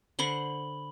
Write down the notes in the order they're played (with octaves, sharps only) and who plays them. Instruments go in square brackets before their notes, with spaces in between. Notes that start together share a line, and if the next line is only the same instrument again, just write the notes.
[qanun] D3 C5 C#6 [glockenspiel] B5 F#7 G7